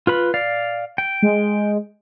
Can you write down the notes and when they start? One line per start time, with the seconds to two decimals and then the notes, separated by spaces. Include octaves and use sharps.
0.07 F4 B4 B5
0.34 D5 F5
0.98 G5
1.22 G#3